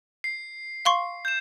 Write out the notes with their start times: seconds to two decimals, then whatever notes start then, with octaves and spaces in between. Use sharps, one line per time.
0.24 C7
0.85 F5 C6 C#6
1.25 G6 E7